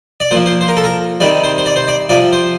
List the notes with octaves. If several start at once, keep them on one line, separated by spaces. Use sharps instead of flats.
D5
A#2 F3 C5
C5
C5
A#4
A4
A#4
C3 D#3 G3 D5
C5
C5
D5
C5
D5
C3 F3 D5
C5